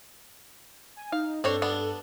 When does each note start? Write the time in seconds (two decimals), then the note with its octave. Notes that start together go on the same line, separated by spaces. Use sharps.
0.96 G#5
1.12 D#4 F5
1.44 G2 C4 D4 A4 C#5
1.62 B3 D4